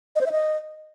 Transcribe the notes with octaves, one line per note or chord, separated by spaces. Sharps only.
D#5
C5
E5
D#5